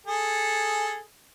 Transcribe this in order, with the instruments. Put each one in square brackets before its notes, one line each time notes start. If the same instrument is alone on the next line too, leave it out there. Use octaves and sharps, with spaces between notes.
[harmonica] G#4 A4